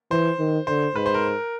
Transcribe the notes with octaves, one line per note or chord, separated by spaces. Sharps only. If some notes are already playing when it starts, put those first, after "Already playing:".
E3 C5
D#3
D3 C5
G#2 B4
C5
A#4